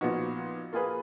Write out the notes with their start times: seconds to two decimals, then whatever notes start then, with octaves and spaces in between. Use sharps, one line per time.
0.01 A#2 F3 B3 D#4 F#4
0.73 A#3 F4 G#4 B4